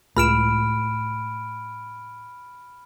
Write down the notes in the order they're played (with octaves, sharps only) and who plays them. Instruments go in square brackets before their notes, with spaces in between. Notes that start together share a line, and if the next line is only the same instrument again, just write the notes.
[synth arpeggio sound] C#2 E7 [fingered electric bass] A2 [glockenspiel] B5 F6 D7